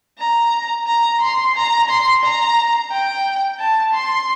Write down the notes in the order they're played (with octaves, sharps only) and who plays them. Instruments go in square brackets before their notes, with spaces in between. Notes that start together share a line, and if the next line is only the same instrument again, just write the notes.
[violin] A#5
A#5
C6
A#5
C6
A#5
G5
A5
C6